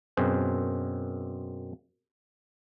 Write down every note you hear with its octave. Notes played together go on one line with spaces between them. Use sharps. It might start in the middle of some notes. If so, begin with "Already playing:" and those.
F#2 B2 C4 G#4 C5